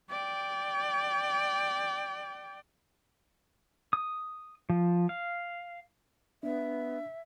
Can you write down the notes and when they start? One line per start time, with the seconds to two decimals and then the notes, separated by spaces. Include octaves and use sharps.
0.10 D5 G5
3.93 D#6
4.70 F3
5.09 F5
6.43 B3 D4 E5